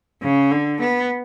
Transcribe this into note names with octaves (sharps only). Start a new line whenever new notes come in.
C#3
D3
B3